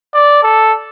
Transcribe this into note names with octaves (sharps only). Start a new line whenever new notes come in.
D5
A4